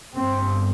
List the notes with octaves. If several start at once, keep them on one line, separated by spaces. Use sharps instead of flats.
G1 G2 C4